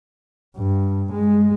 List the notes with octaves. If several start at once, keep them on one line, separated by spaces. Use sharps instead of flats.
G2
G#3